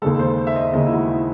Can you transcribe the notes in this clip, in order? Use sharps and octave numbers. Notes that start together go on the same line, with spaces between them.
D#2 C#3 G#3 A4
C5
E5
D#5
D#2 C#3 G#3 D#5
E4
F#4
E4